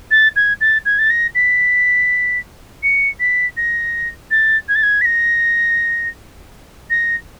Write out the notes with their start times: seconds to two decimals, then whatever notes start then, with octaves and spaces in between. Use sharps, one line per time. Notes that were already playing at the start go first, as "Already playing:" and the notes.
0.11 A6
0.36 G#6
0.61 A6
0.86 G#6
0.99 A6
1.10 A#6
1.35 B6
2.83 C#7
3.20 B6
3.57 A#6
4.31 A6
4.69 G#6
4.75 A6
4.83 G#6
5.01 B6
5.05 A#6
6.90 A#6